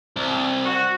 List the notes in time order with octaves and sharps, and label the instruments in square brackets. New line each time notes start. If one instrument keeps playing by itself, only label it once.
[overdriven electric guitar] C2
[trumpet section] F#4